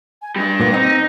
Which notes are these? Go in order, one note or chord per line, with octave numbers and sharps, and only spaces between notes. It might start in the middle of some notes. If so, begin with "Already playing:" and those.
G#5
G3 D4 A#6
A#2 A#3 B3
C4 D#4